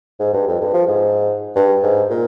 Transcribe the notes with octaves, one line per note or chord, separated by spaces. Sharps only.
G#2
G2
F2
G2
F3
G#2
G2
G#2
A#2